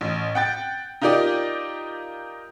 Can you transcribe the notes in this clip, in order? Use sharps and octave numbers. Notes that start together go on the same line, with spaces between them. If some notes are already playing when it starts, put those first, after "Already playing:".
A1
F#5 G5 A6
D#4 F4 G4 A#4 D5 D#5